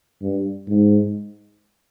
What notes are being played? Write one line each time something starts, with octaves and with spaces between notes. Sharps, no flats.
G2
G#2